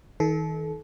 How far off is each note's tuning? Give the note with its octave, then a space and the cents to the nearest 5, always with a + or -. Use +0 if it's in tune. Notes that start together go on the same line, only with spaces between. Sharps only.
D#3 +35 A4 -30